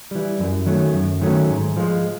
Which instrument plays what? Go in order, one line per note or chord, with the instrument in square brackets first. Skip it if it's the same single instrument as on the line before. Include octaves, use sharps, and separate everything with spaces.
[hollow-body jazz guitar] E3 G3
F#2
D#3 F#3 A3 C#4
F#2
D#3 F#3 A3 C#4
G#2
F3 G#3